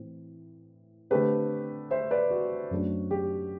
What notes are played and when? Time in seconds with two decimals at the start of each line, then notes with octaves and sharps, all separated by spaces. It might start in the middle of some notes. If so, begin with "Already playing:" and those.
Already playing: A2 E3 C4
1.10 D3 A3 C4 G4 B4
1.91 C5 E5
2.11 B4 D5
2.30 F#4
2.71 F#2 F#3 A3 D4
3.11 G4